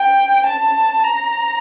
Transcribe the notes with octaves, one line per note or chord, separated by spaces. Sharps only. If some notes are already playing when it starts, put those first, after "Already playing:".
Already playing: G5
A5
A#5